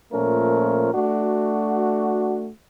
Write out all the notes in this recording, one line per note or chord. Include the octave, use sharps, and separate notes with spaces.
A#2 F3 A3 C#4 A#4
A3 D4 F#4